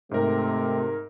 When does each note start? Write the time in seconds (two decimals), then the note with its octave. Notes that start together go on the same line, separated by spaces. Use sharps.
0.11 G#2 C3 A3 A#4